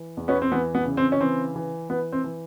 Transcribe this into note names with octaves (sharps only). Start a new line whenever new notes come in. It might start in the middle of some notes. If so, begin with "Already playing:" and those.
Already playing: E3
E2
B3 C#4
C4
E3 B3
B3
C#3
C4
C#4
E3 C4
E3
E3 B3
C4
E3